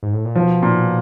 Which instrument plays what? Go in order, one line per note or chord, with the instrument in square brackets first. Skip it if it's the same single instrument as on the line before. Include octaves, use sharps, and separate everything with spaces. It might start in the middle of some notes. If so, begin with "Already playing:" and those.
[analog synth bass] G#2
A2
A#2
[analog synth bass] B2 [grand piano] F3
[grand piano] A#2